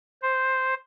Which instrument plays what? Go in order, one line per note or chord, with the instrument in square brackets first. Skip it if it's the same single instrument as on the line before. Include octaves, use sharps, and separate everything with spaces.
[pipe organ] C5